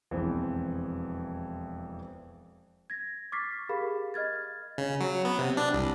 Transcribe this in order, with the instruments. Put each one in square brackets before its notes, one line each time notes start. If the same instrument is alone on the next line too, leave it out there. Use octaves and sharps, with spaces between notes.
[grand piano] E1 F2 E3 B3 C4
[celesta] G#6 A#6
C#6 D6 F6 A6 B6 C7
G4 G#4 A#4 F5 B5
D#5 F6 G#6 A6
[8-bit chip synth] C#3
F#3
B3
C3
D4
C2